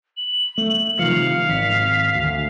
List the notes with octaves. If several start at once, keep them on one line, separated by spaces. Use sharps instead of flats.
F#7
A3
C3 D#3 F3 F5 C#7
G#1 B6
D2